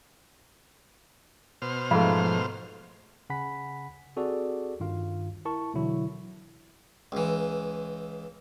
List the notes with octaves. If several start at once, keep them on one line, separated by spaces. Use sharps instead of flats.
B2 C5 F6
G#2 F3 A3 F5 B5
C#3 F#5 G#5 B5 B6
C4 F#4 G#4 A4 D5
G2 D#3 F4 F5
E4 A#4 A5 C#6
B2 D3 E3 F#3 E4
C#2 E3